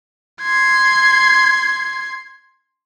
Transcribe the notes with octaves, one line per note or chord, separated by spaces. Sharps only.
C6 G#6